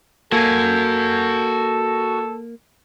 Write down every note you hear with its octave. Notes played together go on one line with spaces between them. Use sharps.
A#3 F#4 A4 G#5